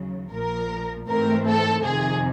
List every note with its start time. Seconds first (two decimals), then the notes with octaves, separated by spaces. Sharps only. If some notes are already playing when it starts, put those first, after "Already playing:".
Already playing: D#2 C#3 F#3
0.32 A#1 A#2 F3 A#4
1.08 G#2 E3 A3 C4 A#4
1.46 A4
1.85 F2 C3 D#3 G#4